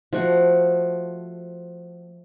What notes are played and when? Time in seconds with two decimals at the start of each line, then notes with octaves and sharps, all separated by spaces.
0.13 F3 A3 F#4